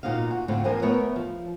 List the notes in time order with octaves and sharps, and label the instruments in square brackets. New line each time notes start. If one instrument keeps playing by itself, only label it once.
[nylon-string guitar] A#2 A#3 D#4 F#4 F5
F#4
A2 D3 C4 F4
E2 A2 F3 A#4 C5 G#5
A3 B3 A#4 C#5
F3